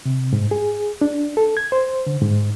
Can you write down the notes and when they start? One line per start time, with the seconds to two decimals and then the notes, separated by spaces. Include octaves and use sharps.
0.06 C3
0.33 G#2
0.51 G#4
1.01 D4
1.37 A4
1.57 G#6
1.72 C5
2.07 D3
2.21 G#2